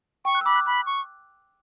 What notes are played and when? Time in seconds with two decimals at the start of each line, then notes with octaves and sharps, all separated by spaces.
0.25 G5 C#6
0.35 F#6
0.41 E6
0.45 B5 D6
0.56 F#6
0.66 B5 F#6
0.86 C#6